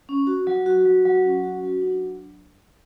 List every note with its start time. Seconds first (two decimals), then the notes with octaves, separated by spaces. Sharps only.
0.09 C#4
0.27 F#4
0.47 F#3
0.66 F#4
0.86 F#3
1.05 F#3
1.25 C#4
1.43 F#4
1.63 F#3
1.82 D4